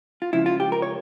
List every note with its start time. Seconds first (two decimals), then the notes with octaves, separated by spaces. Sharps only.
0.22 F4
0.33 C#2 C#3 F3 E4
0.46 F4
0.60 G4
0.72 A#4
0.82 C#5